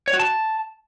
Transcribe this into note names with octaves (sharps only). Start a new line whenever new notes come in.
C#5
F#4
A5